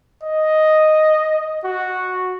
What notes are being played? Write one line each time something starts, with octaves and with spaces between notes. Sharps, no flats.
D#5
F#4